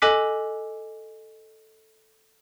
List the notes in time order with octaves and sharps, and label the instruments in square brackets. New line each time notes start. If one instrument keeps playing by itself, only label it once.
[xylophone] A4 D#5 G#5 D6 F#6 B6